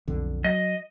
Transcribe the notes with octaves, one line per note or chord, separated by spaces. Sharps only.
B1 F2 D3
F#3 D#5